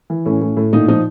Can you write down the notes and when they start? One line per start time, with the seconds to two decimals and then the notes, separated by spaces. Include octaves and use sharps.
0.10 E3
0.26 A2 C#4
0.41 A2
0.57 A2
0.73 A#2 D#4
0.88 F3 D#4